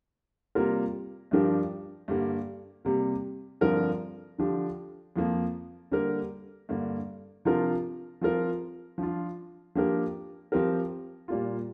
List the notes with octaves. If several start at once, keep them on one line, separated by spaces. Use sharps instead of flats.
C3 G3 A#3 F4 A#4
G2 F3 D4 G4 A#4
G2 D3 G3 A#3
C3 G3 A#3
G2 D3 F3 C4 A#4
D3 F3 D4 G4
F2 F3 A#3
D3 G3 A#3 G4 A#4
G2 D3 A#3
C3 F3 D4 F4 A#4
F3 C4 F4 A#4
F3 D4 F4
F3 A#3 D4 G4 A#4
F3 C4 G4 A#4
A#2 G3 A#3 F4